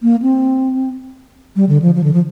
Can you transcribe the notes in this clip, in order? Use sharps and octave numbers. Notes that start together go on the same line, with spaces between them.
A#3
C4
G3
D3
F3
F3
D3
F3